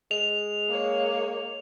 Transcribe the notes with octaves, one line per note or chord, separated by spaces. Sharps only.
G#3 F7
A#3 C#5